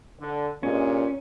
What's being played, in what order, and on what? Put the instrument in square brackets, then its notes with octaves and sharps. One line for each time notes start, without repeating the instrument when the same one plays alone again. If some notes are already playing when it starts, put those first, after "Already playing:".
[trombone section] D3
[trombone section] G2 G#3 [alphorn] A#2 [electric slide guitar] C#4